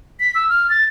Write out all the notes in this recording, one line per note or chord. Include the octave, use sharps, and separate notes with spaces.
B6
E6
F6
A6